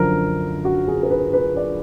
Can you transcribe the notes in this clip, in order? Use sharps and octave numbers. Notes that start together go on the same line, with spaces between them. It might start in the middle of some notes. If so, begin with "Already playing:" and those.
Already playing: F#2 D3 F3 A#4
F#4
G#4
A#4
B4
B4
D5